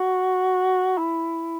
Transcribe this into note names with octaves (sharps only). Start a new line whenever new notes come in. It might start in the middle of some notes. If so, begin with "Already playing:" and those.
Already playing: F#4
E4